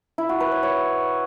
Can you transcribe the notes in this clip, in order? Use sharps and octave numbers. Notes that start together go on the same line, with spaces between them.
E4
F#4
B4
C#5
C#5